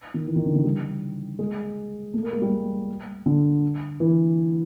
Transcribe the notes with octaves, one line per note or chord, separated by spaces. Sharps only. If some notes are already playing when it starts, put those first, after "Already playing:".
D#3
E3
D#3
D3
C#3
G3
G#3
A3
A#3
G#3
G3
D3
E3